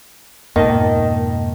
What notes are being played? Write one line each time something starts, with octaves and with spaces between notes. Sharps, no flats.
F2 G#2 B2 D#3 A#3 A#4 D#5 A5